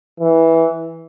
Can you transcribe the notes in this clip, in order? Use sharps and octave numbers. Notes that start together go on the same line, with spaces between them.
E3